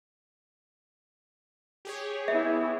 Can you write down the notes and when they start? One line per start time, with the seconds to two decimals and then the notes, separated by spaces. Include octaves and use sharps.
1.85 G4 G#4 C#5
2.28 B3 E4 E5